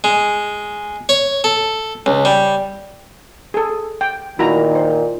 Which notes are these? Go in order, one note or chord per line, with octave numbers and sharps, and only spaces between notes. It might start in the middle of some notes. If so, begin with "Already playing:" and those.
G#3
C#5
A4
C#2
G3
G#4 A4
G5
A#2 D#3 E4 F#4 A#5
C5